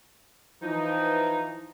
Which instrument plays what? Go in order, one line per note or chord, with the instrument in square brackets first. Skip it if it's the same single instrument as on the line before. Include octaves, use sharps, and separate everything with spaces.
[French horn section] E3 F3 [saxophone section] D#4